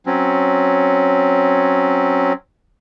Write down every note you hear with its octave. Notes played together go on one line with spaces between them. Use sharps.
F#3 C4 C#4